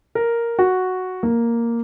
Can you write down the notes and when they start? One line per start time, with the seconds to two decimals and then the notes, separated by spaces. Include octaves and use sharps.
0.15 A#4
0.59 F#4
1.23 A#3